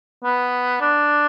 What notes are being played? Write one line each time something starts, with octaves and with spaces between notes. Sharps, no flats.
B3
D4